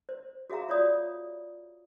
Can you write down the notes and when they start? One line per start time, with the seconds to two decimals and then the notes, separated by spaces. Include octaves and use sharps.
0.09 C5
0.50 F#4 G#4 E5 F5 A#5
0.69 F4 C#5 D5 D#6